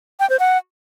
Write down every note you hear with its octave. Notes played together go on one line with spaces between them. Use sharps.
G5
C5
F#5